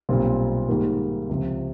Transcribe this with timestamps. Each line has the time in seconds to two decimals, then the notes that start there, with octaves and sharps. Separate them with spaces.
0.09 B1 A#2 G3 C4 F4
0.68 G#2 D#3 G3 A#3
1.29 C#2 C3 F3